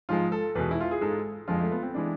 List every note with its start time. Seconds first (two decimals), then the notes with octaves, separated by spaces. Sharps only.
0.09 G#2 F3 G#3 F4
0.32 A4
0.55 E2 B2 G#3 B4
0.71 E4
0.81 F4
0.91 G#4
1.01 G#2 G#3 A4
1.48 F2 D3 F3 G#3 F4
1.60 A3
1.71 B3
1.83 C4
1.94 E3 G#3 D4